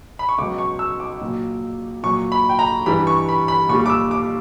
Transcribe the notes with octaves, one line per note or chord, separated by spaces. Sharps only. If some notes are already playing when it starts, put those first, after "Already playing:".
B5
C#6
C#2 B2 F#3 D6
C#6
E6
D6
A#2 F#3
A#2 F#3 C#6
B5
G5
A#5
G2 E3 G3 B5
C#6
B5
B5
A#2 G3 C#6
D6
E6
D6